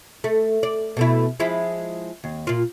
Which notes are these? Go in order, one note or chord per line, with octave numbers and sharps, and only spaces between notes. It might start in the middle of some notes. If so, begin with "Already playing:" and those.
A3
D5
B2 A3 E4
F3 G#3 E4
D#2
A#2 F4